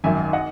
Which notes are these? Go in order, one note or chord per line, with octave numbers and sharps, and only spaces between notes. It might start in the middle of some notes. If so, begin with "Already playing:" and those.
G#1 F#2 D#3 E5 G#5
D#5 F#5